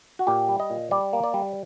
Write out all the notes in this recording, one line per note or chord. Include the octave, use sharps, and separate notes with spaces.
F#4
A#2 G4
G3
D#5
A#2
G3 D5
A#3
D5
G3